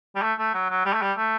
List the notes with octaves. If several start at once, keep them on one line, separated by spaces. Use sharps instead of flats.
G3
A3
A3
F#3
F#3
G3
A3
G3
A3